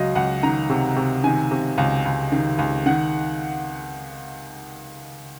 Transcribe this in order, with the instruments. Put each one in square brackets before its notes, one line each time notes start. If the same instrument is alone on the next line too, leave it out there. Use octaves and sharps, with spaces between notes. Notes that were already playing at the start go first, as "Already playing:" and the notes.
Already playing: [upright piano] C#2 F#3 D#5 F5
C#2 F#5
D#3 A#5
C3
C3
D#3 G#5
C3
C#2
C#2
D#3
C#2
D#3 F#5